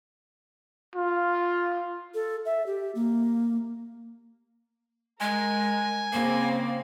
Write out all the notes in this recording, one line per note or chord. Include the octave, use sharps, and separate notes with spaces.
F4
A4
E5
G4
A#3
G#3 A#4 G#5
C#3 A#3 C4